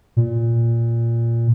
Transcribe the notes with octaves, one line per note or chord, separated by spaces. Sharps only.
A#2